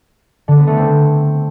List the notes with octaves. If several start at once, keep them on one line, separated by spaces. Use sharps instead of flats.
D3
B3
A3
C4